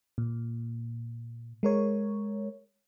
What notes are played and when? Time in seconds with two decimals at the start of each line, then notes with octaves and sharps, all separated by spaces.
0.18 A#2
1.63 G#3 A#4 C#5